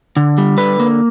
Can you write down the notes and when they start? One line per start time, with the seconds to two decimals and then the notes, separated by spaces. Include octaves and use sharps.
0.17 D3
0.38 G3
0.58 D3 B4
0.80 A#3